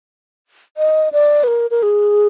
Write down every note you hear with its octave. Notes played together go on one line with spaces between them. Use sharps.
D#5
D5
B4
A#4
A#4
G#4